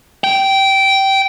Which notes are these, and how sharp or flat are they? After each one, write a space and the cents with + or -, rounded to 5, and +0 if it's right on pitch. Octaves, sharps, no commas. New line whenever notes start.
G5 -15